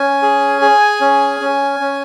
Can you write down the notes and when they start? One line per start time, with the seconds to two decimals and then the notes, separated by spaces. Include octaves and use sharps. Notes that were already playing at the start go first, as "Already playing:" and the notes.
Already playing: C#4 G#5
0.22 G#4
0.61 G#4
1.01 C#4
1.40 C#4
1.80 C#4